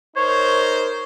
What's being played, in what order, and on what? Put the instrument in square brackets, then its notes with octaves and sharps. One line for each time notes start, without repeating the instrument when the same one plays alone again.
[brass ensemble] D#4 A#4 C5 [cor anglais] C#5